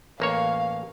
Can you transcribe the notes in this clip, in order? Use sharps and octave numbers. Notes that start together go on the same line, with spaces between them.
A1 A#3 C#5 F5